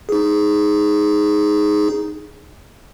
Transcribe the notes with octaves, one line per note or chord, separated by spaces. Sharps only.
D#4 G#4